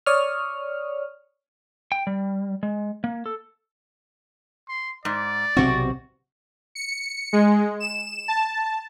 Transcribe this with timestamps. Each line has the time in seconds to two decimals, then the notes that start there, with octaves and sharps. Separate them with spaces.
0.06 C#5 D5 C#6 D#6 F6
1.92 G5
2.07 G3
2.63 G#3
3.04 A#3
3.26 A4
4.69 C6
5.05 G#2 D5
5.57 B1 C3 C4 F#4
6.75 C#7
7.33 G#3
7.80 E7
8.28 A5